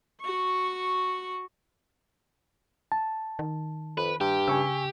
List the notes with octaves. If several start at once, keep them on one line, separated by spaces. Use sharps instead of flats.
F#4 C#6
A5
D#3
F2 B4
G2 G4
C#3 G#5 C#6 E6